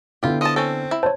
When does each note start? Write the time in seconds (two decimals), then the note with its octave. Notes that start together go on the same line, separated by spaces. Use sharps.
0.23 D3 B3 E4 F4 G4
0.41 F3 D#5 A5
0.56 C4 C#4 A4
0.91 E4
1.03 C5 C#5 A5